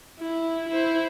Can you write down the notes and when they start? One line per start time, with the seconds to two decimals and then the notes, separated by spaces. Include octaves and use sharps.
0.19 E4
0.69 E4 C5